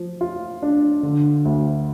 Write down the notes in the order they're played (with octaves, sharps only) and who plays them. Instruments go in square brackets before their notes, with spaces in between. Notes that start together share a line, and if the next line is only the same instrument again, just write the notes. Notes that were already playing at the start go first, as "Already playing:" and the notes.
Already playing: [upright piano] F3
F4
D4
D3
D2